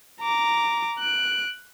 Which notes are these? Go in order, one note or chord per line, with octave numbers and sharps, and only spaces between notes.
A#5 D6
F#6 D7